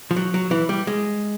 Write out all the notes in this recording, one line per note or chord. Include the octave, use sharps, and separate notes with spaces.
F3
F#3
F#3
E3
G3
G#3